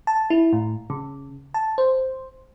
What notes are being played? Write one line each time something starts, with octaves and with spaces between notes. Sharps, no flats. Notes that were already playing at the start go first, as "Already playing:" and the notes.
A5
E4
A2
C#3
A5
C5